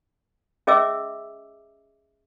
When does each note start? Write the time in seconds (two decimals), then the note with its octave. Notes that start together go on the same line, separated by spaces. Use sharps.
0.67 C#4 G#4 D#5 E5 D6 E6